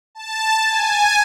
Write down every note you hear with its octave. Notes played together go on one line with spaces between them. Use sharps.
A5
G#5